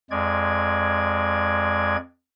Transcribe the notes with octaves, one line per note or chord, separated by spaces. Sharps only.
F2 G#3 D5 G#6